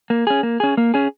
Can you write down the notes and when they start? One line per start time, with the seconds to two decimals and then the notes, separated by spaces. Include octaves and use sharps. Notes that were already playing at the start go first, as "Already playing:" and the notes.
0.10 A#3
0.27 C#4 G#4
0.43 A#3
0.60 C#4 G#4
0.77 A#3
0.94 C#4 G#4